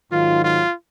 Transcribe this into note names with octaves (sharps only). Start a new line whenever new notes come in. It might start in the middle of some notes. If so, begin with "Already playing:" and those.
G#2 D#3 F#3 F4
F4